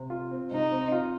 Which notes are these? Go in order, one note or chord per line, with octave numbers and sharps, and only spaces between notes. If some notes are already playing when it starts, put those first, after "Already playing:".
Already playing: C3
F4
C4
C3 D#4
C4
F4